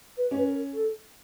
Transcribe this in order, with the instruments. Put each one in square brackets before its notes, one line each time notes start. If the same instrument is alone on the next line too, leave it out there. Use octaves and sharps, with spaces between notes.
[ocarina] B4
[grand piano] C#4
[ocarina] B4
A#4
A4